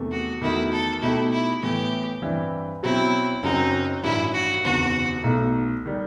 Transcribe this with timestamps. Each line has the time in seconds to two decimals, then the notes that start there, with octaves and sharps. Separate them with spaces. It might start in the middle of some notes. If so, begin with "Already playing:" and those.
Already playing: E2 C3 D#3 A3
0.11 F#4
0.41 E2 D#3 A3 D#4 E4 F#4
0.72 A4
1.01 B2 A3 D#4 E4 G4
1.32 E4
1.62 A2 E3 B3 G4
2.22 G2 E3 G3 C4 E4
2.83 B2 F#3 C4 E4
3.43 F#1 F#2 F#3 C4 D#4 F#4
4.03 A1 G2 D#3 F#3 E4
4.33 F#4
4.64 F#1 E2 C3 D#3 F#4
5.24 B1 B2 A3 D#4
5.86 D#3 G3